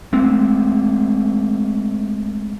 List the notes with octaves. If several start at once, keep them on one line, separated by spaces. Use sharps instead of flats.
G#3 A3 C4